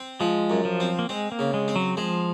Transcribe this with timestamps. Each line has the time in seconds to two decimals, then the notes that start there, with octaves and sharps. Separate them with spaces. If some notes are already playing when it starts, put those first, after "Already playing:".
Already playing: C4
0.20 F3 G#3
0.50 F#2
0.65 F3
0.80 C4
0.99 A#3
1.09 G#3 C4
1.32 A#3
1.39 C#3
1.54 G#3
1.68 C4
1.76 F#3
1.97 F3 G#3